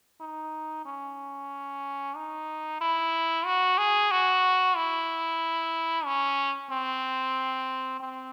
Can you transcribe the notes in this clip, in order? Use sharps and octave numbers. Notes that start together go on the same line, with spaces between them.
D#4
C#4
D#4
E4
F#4
G#4
F#4
E4
C#4
C4
C4